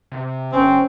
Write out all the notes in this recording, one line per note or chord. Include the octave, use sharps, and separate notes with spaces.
C3
G1 C4 C#4